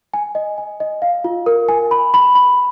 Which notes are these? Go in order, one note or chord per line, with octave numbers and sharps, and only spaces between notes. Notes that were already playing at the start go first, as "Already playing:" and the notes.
G#5
D#5
G#5
D#5
F5
F4
A#4
G#5
B5
B5
B5